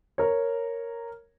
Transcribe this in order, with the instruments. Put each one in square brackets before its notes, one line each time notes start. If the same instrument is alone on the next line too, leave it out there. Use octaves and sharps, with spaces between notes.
[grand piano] A#4 C#5